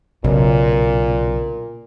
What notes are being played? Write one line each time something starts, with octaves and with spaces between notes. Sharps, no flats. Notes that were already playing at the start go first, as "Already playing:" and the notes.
B1 A#2 C#3